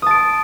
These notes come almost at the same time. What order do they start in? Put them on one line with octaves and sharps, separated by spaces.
D#6 A5 D7